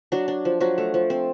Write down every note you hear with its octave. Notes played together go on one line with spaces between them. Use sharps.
F#3 D4 F#4
D4
F3
F3 F#3 F#4
A3
F3
C4